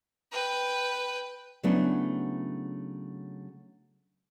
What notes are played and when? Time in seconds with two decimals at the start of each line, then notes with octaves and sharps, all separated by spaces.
0.32 B4 G5
1.63 C#3 F#3 A3 B3 D4 E4